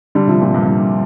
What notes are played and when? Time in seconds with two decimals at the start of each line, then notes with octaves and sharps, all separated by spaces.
0.15 D3 G3
0.28 C3 F3
0.41 A#2
0.54 G2
0.67 G2